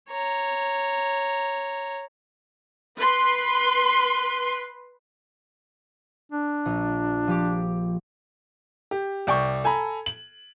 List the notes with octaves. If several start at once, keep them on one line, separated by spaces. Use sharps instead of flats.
C#5 A#5
B4 C6
D4
A#1
F3 G4 D6
G4
C2 D5 G5 C#6
A4 G#5 A#5 B5
F#7